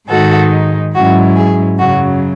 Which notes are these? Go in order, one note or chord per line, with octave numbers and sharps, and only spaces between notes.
G#2 D#3 G#3 D#4 F#4 A4
G#2 F#3 C#4 E4 F#4
G#4
F#2 C#3 F#3 F#4